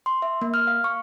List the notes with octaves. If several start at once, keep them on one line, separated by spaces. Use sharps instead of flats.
C6
E5
A#3
F6
F5
C#6